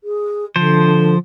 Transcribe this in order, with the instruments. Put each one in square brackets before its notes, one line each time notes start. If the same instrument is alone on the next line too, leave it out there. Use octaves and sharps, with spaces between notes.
[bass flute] G#4
[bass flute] D3 [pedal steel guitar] F3 C5